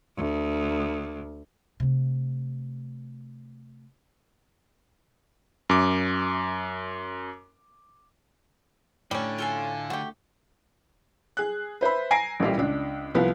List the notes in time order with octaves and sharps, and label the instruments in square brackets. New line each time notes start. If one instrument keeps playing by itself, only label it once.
[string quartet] D2
[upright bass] C3 A3
[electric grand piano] F#2 D6
[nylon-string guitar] A2 [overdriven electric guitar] D3 [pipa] G3 C#4
[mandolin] F4 A4 G#5
[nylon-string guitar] A3 [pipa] F#4 G4
[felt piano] G#4 F#6
B4 C5 E5 B5
G#5 A#5 A#6 C7 D7
A1 A#2 E3 G3
C#2 D4
C2 F3 B3